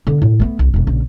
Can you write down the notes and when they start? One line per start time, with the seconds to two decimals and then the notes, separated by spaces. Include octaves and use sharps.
0.07 D3 B3
0.22 A2
0.39 A3 B3
0.59 C2
0.74 E1 F2
0.87 A#1 C#3